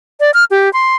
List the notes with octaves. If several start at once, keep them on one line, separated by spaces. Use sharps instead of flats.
D5
F6
G4
C6